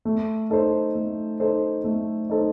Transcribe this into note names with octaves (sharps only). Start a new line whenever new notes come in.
A3
D#4 A4 C5
A3
D#4 A4 C5
A3
D#4 A4 C5